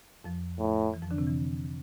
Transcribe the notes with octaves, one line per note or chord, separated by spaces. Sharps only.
F2 F3
A2
E3
F2 F3
D3 D4
C3 C4
E3